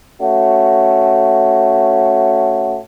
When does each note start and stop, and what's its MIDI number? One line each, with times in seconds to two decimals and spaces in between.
0.22 2.77 57
0.22 2.77 61
0.22 2.77 66